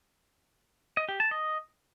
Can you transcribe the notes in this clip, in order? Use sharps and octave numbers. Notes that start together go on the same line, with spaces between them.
D#5
G4
A5
D#5